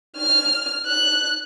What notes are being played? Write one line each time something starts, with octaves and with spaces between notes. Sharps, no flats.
F6
F#6